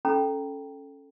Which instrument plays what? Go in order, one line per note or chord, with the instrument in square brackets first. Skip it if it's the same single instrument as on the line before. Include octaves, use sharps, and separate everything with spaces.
[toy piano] C#4 A4 G5 A#5 B5